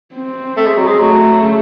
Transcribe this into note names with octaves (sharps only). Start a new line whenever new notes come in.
C4
A3
G#3
F#3
G#3
F#3 A3
C#3